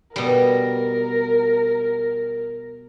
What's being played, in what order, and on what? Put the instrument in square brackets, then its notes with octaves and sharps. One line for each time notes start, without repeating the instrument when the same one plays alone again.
[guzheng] B2 G3 [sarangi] A#4